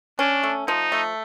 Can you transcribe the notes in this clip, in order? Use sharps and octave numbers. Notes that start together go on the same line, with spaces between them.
C#4 D4
A3
F3 D#4
A3